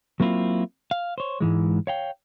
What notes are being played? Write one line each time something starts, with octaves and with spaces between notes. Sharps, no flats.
F#3 A#3 C4 E4 F4
F5
C5 C#5
G#2 E3 G#3
C#5 F5 G5